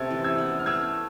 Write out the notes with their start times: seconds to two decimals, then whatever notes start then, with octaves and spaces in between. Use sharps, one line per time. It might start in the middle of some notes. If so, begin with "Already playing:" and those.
Already playing: C3 A3 E6 G#6 A6
0.10 E3
0.24 E6 G#6
0.38 B3
0.59 F6
0.66 A3 E6 G#6